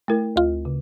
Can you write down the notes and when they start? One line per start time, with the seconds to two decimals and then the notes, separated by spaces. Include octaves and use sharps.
0.08 A3 E4 A#4
0.36 D2 F4
0.65 C#3